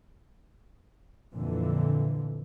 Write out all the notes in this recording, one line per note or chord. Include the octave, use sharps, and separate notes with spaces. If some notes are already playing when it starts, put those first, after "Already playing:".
F2 A#2 D3 E3